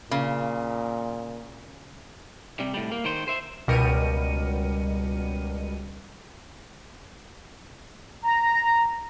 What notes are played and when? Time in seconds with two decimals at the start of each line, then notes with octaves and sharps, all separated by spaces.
0.11 A#2 C#3
2.60 C3 G3
2.74 A2 G3
2.92 A#3
3.05 D#3 C5
3.28 C5 E5
3.68 C#2 B2 G3 A#4 C#7 D#7
8.24 A#5